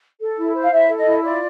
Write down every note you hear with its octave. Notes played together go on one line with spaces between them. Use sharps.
A4
E4
C5
F5
E4 E5
A4
D#5
E4
F4 D5